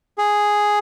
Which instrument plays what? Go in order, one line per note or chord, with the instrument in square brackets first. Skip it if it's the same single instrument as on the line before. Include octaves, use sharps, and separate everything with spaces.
[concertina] G#4